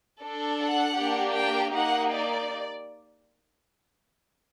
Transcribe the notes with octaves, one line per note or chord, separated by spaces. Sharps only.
D4 A4
F#5
A#3 D4 G4
G5
A#3 D#4 G4 F#5
D5